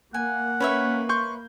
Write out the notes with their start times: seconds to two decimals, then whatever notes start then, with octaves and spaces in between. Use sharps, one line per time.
0.14 A#3 F#5 G#5
0.60 C#4 B4 C#5 E5
1.09 C6 C#6 G6